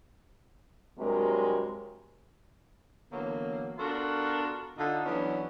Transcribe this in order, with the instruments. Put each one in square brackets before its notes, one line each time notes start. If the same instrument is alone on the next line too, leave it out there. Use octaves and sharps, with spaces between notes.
[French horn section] G2 C3 F#3 G#3 A#4
[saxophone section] D3 E3 F#3 A#3 B3
B3 D4 F4 F#4 A4 A#4
D3 D#4 F4
E3 F#3 B3 C#4 D4